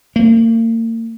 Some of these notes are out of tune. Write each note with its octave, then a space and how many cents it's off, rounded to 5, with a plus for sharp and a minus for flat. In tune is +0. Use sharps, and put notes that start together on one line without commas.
A#3 -40